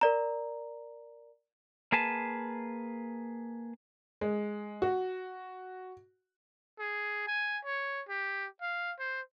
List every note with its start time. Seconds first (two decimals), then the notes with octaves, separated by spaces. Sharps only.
0.01 A#4 D5 A#5
1.92 A#3 G#4 B4 A5
4.21 G#3
4.82 F#4
6.79 G#4
7.28 G#5
7.64 C#5
8.09 G4
8.61 F5
8.99 C5